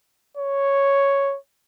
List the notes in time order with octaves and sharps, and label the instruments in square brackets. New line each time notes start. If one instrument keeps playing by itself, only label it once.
[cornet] C#5